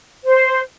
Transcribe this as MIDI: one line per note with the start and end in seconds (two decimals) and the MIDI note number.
0.24 0.61 72